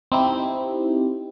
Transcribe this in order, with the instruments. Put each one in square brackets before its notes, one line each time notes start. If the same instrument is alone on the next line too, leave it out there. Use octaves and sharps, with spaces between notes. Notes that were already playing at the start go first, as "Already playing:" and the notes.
[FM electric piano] C4 D#4 E4 G4